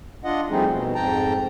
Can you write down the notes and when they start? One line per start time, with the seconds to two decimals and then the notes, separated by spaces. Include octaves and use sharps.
0.24 D4 F4 D#5 F#5
0.50 F3 G3 A3 C4 D#4 G#4
0.71 B2
0.95 F2 G#2 G5 A5 A#5